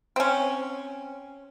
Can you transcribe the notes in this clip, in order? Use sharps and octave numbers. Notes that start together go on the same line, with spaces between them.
C4 C#4